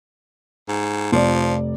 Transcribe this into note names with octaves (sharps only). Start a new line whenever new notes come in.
G#2
F1 F3 D5